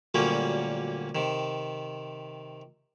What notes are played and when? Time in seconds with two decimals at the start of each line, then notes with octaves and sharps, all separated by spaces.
0.14 D2 A#2 F#3 G3 A#3 C#4
1.15 C3 D#3